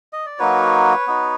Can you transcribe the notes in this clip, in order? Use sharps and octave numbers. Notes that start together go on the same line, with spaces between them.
D#5
D5
F#3 A#3 D#4 F#4 B4 C#5
B3 D#4 F#4